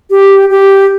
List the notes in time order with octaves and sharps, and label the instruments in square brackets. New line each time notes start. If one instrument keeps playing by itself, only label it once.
[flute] G4
G4